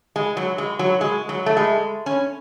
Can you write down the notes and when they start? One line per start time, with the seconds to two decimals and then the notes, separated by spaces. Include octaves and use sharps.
0.16 G#3
0.37 F#3
0.58 G#3
0.79 F#3
1.01 G#3
1.29 F#3
1.46 A3
1.57 G#3
2.06 C#4